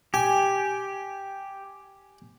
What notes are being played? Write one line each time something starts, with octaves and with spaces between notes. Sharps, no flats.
G4 G#5